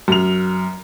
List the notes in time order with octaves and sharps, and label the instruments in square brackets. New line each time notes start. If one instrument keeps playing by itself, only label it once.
[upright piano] F#2 F7